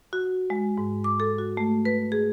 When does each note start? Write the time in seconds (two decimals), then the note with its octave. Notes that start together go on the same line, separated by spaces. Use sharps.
0.13 F#4
0.50 G#3
0.78 G#2
1.04 D6
1.20 A4
1.38 F#4
1.57 A3
1.85 B4
2.12 G#4